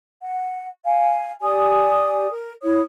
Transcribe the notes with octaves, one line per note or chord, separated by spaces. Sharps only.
F#5
F5 G#5
G4 D5 G#5 D#6
A#4
E4 C#5 D#6